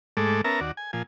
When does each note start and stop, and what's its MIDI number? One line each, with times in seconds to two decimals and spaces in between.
0.17 0.41 44
0.17 0.41 56
0.17 0.41 57
0.17 0.41 69
0.17 0.41 86
0.44 0.60 59
0.44 0.60 61
0.44 0.60 70
0.44 0.60 76
0.44 0.60 81
0.44 0.60 82
0.61 0.72 39
0.61 0.72 66
0.61 0.72 74
0.77 0.91 80
0.93 1.03 46
0.93 1.03 53
0.93 1.03 80